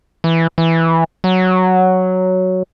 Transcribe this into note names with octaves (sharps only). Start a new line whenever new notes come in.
E3
E3
F#3